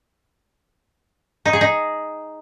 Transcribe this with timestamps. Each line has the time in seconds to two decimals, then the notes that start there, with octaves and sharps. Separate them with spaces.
1.45 D#4
1.53 G#4
1.61 D#4